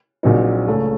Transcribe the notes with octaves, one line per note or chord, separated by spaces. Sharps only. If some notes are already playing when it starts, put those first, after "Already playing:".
A#1 A#2 F#3 C4 D#4
C#2 C#3 A3 C#4